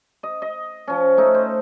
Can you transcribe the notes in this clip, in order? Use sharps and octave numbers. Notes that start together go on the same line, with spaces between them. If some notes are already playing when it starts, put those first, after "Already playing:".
D#5
D#5
F3 C#4
A3 D#4 A4
C5